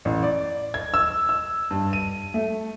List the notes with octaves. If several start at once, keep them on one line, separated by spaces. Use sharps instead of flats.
A1
D5
G#6
E6
E6
G2
D#7
A3